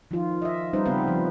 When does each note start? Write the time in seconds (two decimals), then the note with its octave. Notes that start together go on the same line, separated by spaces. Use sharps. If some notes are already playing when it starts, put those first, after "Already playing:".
0.11 D#3 F3 F4
0.42 D#5 E5
0.73 G3 C#4 D#4 B4 C5
0.86 C#3 B3 C4 B4 F5
1.08 F3